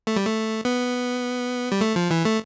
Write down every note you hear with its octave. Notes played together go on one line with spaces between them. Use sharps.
A3
G3
A3
B3
G3
A3
F3
E3
A3